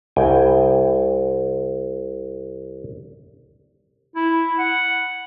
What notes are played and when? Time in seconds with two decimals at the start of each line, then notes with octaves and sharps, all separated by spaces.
0.16 C2 G5 G#5
4.15 E4
4.59 F#5